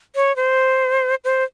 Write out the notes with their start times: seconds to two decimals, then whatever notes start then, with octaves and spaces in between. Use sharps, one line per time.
0.15 C#5
0.36 C5
1.24 C5